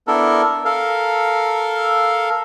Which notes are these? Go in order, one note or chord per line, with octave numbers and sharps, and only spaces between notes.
B3 D4 E4 A4 A#4
A4 A#4 F5